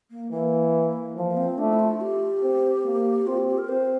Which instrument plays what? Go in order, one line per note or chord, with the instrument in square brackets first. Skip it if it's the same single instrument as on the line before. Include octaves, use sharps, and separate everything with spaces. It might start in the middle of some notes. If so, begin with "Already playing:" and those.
[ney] A#3
[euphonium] E3 [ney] A#3
[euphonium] F3 [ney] A#3
[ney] A#3
C4
[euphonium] A3 [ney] D4
[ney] E4
F4
G4
[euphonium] C4
A#3
[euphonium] C4 [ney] F4
[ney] G4
G4
A#4
[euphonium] C4 [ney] C5